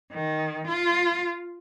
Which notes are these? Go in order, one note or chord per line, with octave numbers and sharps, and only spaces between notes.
D#3
F4